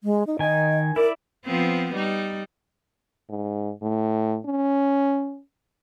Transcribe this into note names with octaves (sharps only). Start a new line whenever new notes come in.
G#3
D#4
D#3 D#5 G#5
E4 A#4 D5
F3 B3 C4
G3 D#4
G#2
A2
C#4